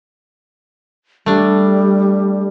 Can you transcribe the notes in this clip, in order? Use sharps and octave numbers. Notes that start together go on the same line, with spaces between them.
G3 A3 D4